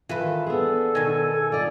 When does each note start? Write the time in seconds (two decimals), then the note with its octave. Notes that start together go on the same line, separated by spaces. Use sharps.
0.09 D#3 E3 F4 A4 B4
0.46 B3 D4 G#4 A4
0.95 B2 D#3 G#5
1.52 F4 D5 D#5